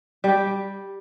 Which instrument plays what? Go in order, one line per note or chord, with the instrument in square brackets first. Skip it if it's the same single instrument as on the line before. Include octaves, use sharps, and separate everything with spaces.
[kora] G3 G4